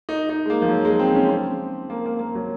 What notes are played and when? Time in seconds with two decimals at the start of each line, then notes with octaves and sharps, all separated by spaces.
0.09 D#4
0.29 D#4
0.46 G#3
0.50 A#3
0.62 F3
0.69 F#3
0.85 G#3
0.99 C4
1.15 C#4
1.29 C4
1.90 A#3
2.06 A#3
2.19 A#3
2.35 F#3